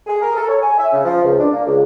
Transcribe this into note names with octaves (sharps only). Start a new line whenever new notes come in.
G#4
A#4
A4
C#5
G#5
E5
C#3
F3
C#2
D4
A#3
C#2